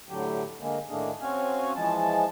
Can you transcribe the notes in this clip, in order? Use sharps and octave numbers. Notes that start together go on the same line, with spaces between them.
A2 D3 F#3 G4
D3 G#3 A#3
A2 D#3 A3 A#3 D4 G#4
C4 C#4 F#4 F5 G#5
E3 F3 G#3 A5